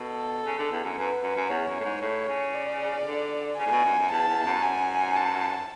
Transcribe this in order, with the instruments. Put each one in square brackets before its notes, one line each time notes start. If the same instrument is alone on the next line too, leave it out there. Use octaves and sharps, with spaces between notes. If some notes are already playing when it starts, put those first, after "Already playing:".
Already playing: [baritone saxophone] B2 [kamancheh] A4
[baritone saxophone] C#3
D3
E2
F#2
[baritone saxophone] F#2 [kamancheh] B4
[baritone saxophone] F#2
F#2
[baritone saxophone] E2 [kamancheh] C#5
[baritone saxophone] F#2
A2
G#2
[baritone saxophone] A2 [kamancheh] C#5
[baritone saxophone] C#3
[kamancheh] D5
[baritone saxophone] D3
[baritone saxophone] C#3 [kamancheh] G#5
[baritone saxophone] A2
B2
F#2
F#2
[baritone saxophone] E2 [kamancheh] A5
[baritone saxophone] E2
F#2
[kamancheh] G#5
A5